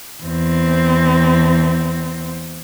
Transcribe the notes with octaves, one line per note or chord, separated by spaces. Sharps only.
E2 C4